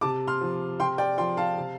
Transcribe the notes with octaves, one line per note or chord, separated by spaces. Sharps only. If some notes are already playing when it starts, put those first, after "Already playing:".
C3 A5 D6
C6 F6
F3
C3 G5 C6
D5 G5
F3 G5 C6
F5 A5
C3